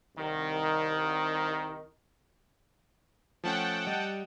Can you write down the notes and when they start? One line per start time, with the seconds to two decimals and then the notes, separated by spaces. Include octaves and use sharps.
0.16 C2 D#3
3.44 F3 A3 C#4 F#5 G5 A5
3.87 G3 D#5